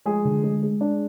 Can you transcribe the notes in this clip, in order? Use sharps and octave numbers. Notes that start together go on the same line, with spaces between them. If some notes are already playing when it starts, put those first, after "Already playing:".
F3 G#3 G#4
D3
G#3
G#3
D4